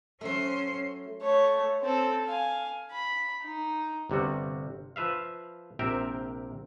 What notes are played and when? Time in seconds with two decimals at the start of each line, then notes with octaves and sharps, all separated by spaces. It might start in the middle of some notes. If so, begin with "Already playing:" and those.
0.21 F#3 A3 C#4 C5
1.22 A3 C#5
1.81 C4 A4
2.27 F5 G#5
2.92 B5
3.43 D#4
4.10 G1 C3 G3 F#4
4.96 F3 B4 E5 F5
5.79 A#1 C3 C4 A#4 E5 G5